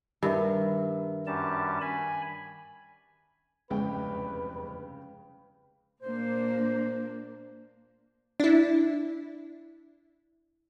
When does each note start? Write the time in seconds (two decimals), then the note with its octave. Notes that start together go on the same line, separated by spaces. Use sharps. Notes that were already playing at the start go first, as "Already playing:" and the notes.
0.23 G2 D#3 A#4 E5
1.27 F#2 G3 A5
1.81 G#5 B5
3.70 F1 E2 G2 C#3 G#3 B4 G5
6.03 A#2 A#3 D4 C5
8.40 D4 E4